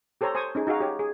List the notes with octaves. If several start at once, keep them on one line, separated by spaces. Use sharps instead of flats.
G4 A4 C5 C#5 A#5 C6
C5 G#5 C#6 D#6
C#4 D#4 G#4
D#4 F#4 G#4 F5
G4 C#5
G#4